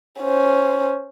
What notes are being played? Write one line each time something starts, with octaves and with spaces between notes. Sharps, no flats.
C#4 C5